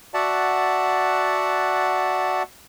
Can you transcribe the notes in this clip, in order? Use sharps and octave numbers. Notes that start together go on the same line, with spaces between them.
F#4 D5 E5 F#5 A5